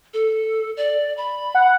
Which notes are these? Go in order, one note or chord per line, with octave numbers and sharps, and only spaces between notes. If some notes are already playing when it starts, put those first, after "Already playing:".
A4
D5
B5
F#5